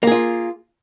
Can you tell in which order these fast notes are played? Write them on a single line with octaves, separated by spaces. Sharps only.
A#3 G#4 F4